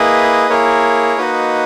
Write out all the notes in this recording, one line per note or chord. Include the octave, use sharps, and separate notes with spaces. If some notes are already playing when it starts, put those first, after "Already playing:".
Already playing: A#3 E4 G#4 B4 D#5
A#3 E4 G#4 A#4 C#5
A#3 D#4 F#4 B4 D#5